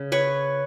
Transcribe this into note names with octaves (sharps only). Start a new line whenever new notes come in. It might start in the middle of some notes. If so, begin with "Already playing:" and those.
Already playing: C#3
B4 C#5